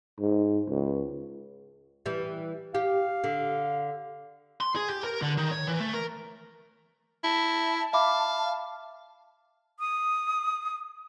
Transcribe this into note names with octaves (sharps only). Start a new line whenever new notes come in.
G#2
C#2
E3 G3
G4 F5
D3
C6
G#4
G4
A#4
D3
D#3
C#5
E3
A3
A#4
E4 A5
E5 F5 B5 D6
D#6